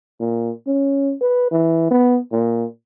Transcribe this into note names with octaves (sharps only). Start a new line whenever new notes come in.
A#2
C#4
B4
E3
B3
A#2